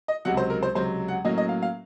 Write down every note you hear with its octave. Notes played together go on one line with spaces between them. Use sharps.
D#5
C#2 C3 F#3 F#5
C5
A#4
C5
C#2 C3 F#3 C5
F#5
A2 F#3 A#3 C#4 D#5
D#5
F5
F5